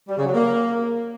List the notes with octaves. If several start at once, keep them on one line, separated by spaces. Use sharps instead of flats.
G3
C#3
F#3
A#3